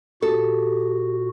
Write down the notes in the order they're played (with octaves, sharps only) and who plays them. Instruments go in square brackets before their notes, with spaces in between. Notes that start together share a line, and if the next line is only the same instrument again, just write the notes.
[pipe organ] A#2 F#4 [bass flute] G4 [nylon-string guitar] A4